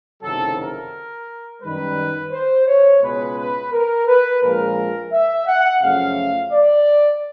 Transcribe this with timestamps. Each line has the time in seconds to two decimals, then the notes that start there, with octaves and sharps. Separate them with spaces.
0.23 F#1 F2 C3 D#3 F#3 A4
0.57 A#4
1.62 F#2 D#3 G3 B4
2.32 C5
2.67 C#5
3.02 C#2 B2 G#3 B4
3.37 B4
3.72 A#4
4.07 B4
4.42 A#1 A#2 F3 G#3 A#4
5.12 E5
5.47 F#5
5.82 F#2 C#3 F3 A3 F5
6.52 D5